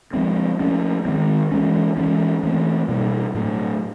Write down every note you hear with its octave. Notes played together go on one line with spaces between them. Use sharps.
F3 G#3 C4
F3 A3 C#4
D#3 G#3 C4
E3 G#3 C#4
E3 G#3 C#4
E3 A3 C4
B2 G3 A#3
A2 F#3 A3